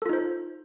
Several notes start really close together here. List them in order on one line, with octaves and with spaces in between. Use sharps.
A4 F4 D#4 C5